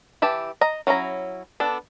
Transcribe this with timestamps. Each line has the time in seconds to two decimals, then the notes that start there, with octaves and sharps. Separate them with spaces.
0.22 E3 G4 E5 A5
0.61 D#5 A#5
0.87 F#3 C#4 E4 A#5
1.60 B3 D4 A4